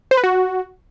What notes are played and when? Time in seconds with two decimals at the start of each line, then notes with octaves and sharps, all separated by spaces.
0.11 C5
0.17 B4
0.24 F#4